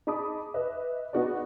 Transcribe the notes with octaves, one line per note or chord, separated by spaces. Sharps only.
D#4 G#4 A5 B5 D6 D#6
B4 D#5 E5
B3 D#4 F#4 G#4 D5